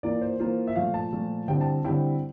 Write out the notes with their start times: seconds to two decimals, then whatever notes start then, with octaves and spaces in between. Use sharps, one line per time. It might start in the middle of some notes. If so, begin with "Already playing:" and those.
0.03 E3 A#3 F4 D5
0.21 C5
0.39 E3 A#3 F4 C5
0.67 E5
0.76 A#2 F3 A3 F5
0.94 A5
1.12 A#2 F3 A3
1.48 D3 G3 C4 E4 G5
1.61 A5
1.85 D3 G3 C4 E4 G5